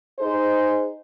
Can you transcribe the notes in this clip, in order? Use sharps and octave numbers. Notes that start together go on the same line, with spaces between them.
D#4 G#4 C5